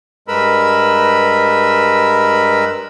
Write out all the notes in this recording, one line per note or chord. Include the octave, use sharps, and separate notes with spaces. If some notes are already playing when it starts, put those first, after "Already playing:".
G2 G#3 A#4 B4 B5 E6